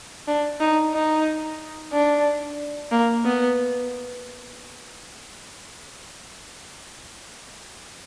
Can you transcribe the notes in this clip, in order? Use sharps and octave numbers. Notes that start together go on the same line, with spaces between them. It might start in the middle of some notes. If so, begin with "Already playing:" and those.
D4
D#4
D#4
D4
A#3
B3